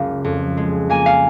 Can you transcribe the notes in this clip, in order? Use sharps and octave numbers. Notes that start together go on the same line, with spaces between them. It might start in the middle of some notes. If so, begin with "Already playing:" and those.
Already playing: F#1 C#2 F5
F2
G#3
A#3 G#5
F5